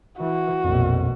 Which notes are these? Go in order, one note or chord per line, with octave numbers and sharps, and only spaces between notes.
E3 F#4
A#1 F2 B2